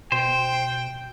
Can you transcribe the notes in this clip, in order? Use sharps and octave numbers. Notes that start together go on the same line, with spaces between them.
B2 C5 G5